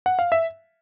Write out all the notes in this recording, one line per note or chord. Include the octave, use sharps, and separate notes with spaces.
F#5
F5
E5